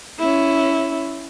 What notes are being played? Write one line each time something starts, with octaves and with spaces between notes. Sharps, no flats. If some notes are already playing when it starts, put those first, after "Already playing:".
C#4 E4